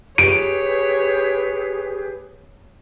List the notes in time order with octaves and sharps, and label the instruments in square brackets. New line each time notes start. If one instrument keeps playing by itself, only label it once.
[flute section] G4 G#4 B4 [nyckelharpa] C#5 [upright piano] D7